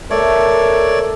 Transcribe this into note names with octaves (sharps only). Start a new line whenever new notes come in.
A3 A#4 C#5 D5